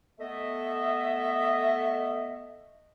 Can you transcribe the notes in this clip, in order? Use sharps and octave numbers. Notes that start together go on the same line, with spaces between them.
A3 B3 D#5 E5